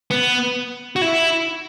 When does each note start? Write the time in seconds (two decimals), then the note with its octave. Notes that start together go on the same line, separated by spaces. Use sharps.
0.11 B3
0.96 F#4
1.02 E4